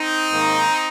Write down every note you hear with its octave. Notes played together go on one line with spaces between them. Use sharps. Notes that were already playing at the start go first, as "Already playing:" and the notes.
Already playing: C4 D#4
G#2 D#3 A#3